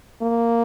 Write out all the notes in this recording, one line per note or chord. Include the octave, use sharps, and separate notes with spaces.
A#3